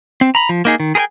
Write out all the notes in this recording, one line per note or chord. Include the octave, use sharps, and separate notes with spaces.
C4
A#5 B5
F3
A#3 D#4 G#4
D#3
G#4 A#4 B4 G5 G#5